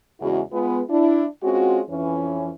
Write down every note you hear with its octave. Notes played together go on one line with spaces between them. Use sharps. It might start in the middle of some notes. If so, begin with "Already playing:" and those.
E2 C#3 G#3 E4 F#4
G#3 B3 F4
D4 E4
G#3 C4 C#4 F4 F#4
F2 E3 C#4